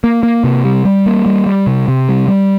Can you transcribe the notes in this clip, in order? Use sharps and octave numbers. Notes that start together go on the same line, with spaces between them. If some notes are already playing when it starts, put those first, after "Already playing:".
A#3
A#3
C3
G3
G3
A#3
G3
G3
C3
C3
G3
G3